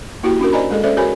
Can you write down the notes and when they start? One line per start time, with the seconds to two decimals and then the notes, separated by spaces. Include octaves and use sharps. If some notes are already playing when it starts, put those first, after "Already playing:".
0.23 A#3 E4 F#4 G4 G5
0.40 C#4 D4 F#4 A#4
0.52 C5 D5 D#5 G#5 A#5 B5
0.71 G#3 G#4 A4 D#5
0.84 C#4 A4 C5 D5 E5
0.97 F#4 G#4 A#4 C#5 G#5 B5